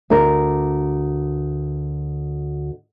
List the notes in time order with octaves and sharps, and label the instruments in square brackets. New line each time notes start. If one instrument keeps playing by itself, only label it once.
[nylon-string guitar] D2 D4 A#4